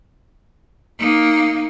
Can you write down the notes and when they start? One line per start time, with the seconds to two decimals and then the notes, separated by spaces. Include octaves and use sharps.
0.99 A#3 D#4